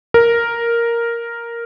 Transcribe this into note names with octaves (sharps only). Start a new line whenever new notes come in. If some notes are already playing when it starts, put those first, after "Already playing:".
A#4